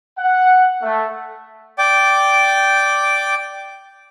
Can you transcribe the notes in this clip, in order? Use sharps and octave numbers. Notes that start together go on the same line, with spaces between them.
F#5
A3
D5 G5 D6